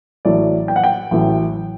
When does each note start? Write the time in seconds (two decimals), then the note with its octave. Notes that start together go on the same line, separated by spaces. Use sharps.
0.25 A1 A2 F#3 D5
0.68 G5
0.76 F#5
0.84 G5
1.11 A1 A2 F#3